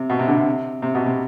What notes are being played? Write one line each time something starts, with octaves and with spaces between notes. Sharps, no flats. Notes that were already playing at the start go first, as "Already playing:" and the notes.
Already playing: C3
B2
C3
D3
C3
C3
B2
C3